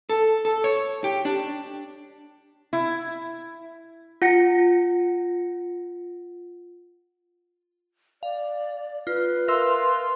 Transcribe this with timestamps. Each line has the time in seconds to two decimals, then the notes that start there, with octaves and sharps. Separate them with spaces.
0.09 A4
0.45 A4
0.64 C#5
1.04 G4
1.25 D4
2.73 E4
4.22 F4 F#5 A#6 C#7
8.23 D5 F5
9.07 F4 B4
9.48 F4 A#4 E5 C6 E6